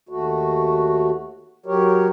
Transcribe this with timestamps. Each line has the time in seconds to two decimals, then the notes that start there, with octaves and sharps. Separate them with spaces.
0.09 D#2 A3 F#4
1.66 F#3 G4 A#4 C#5